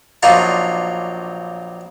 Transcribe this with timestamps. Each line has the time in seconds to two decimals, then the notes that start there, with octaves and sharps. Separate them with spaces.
0.23 A#1 F#3 D4 D#4 F4 F5